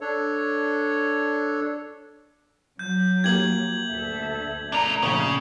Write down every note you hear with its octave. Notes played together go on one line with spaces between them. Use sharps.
D4 A4 C#5
F#3 G6
A#3 G4 G#6 F#7
D2 A4 E5
A3 D4 A#4
A#1 C#3